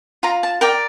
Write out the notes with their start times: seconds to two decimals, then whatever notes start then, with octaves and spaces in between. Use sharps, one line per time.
0.23 F4 A#5
0.43 A5
0.61 A#4 D5 G5